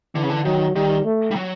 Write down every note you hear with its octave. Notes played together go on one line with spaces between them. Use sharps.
D3 E3
C#3
D3
D#3 F#3
D#3 G3
A3
G3
F#3